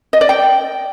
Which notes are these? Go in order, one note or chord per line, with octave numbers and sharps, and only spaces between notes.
D#5
D5
G5